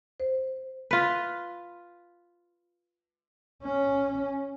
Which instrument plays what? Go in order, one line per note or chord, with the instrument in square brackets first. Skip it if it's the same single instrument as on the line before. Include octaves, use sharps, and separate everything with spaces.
[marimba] C5
[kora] F4 B4
[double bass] C#4